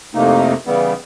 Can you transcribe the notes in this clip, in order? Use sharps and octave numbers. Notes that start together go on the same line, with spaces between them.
F2 A2 C3 A3 A#3 D#4
C#3 E3 G3 B3